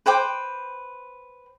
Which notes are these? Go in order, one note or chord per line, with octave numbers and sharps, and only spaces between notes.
B4 C5 G5 D6